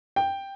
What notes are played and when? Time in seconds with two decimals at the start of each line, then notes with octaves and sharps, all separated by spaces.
0.16 G5